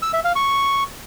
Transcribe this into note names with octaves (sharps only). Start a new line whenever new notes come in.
E6
E5
F5
C#6